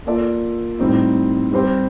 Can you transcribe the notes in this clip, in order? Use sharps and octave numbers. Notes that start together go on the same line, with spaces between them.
A#3 F4 A4 D5
A2 G3 C4 D#4
G3 C4 G4 C5